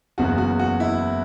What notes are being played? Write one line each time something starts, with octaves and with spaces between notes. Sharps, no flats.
F#1 E2 C#3 F#3 B3 F#4
F#4
F#4
E4